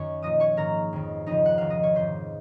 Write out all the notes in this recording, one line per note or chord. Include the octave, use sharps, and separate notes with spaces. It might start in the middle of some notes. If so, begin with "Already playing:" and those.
Already playing: F#2 D#3 C#5 C#6
A#2 F3 D#5 D#6
C#5 C#6
G#2 D#3 A#4 A#5
F2 D#3
F2 C#3 F3 D#4 D#5
F#5
F2 C3 D#3 F5
D#5
C#5
G#2 F3 C5